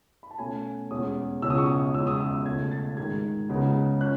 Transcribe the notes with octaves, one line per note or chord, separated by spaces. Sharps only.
B5
A5
B2 A3 C#4 G#5
E2 B2 G#3 C#4 D#6
C#2 B2 G#3 C#4 E6
D#6
C#6
D#6
E2 C#3 G#3 C#4 E6
D#6
E6
C#2 B2 A3 C#4 G#6
A6
G#2 D#3 G#3 G#6
C#2 C#3 G#3 B3
C#4 F#6